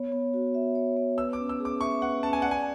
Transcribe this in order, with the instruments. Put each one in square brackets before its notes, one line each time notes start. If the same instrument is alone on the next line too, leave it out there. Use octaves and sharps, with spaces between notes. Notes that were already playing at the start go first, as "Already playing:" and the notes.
Already playing: [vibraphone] B3 C#5
B3
F#4
E5
C#5
B3
[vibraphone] B4 [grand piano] E6
[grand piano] D6
[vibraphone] C#4
[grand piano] E6
[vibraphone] G#4
[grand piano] D6
[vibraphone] E5 [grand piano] C#6
[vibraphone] B4 [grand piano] F#5
[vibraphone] C#4 [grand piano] A5
[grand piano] G#5
[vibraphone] D5 [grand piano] F#5
[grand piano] G#5